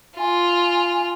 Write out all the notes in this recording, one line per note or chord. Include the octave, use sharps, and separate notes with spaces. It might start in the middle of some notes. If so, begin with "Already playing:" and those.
F4 G#5